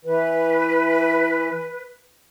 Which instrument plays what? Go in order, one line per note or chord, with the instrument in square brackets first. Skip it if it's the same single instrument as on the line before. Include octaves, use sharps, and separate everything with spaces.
[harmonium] E3 [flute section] B4